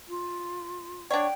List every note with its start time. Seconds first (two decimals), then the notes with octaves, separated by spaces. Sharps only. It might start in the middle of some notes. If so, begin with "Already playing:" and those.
0.08 F4
1.11 D4 C#5 D5 F#5 G5 C6